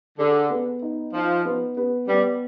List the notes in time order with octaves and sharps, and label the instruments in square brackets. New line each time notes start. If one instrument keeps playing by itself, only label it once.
[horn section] D3 [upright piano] G#4
[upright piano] B3
D#4
[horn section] F3 [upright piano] D#4
[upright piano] B3
B3
[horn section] G3 [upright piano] B3